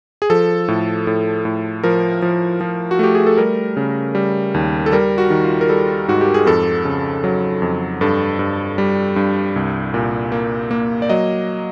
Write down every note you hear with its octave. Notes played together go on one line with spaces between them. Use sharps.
G#4
F3 A4
A2
A2
A2
F3 A#4
F3
F3
F#4
A3 G4
G#4
A4
G3 A#4
C#3
G3
D#2
A4
G3 A#4
F#4
D#3
F4
A#4
G3 A4
G#2 F#4
G4
G#4
F2 A4
C#3
F#3
F2
G2 A4
G2
G3
G2
C2
A#2
A#3
A#3
D5
F#3 D#5